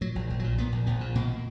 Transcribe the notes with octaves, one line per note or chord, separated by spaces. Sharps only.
A#2 F#3
A#1
A#1
F#3
A#2
A#2 B3
A#1
A#1 B3
A#2
B2 A#3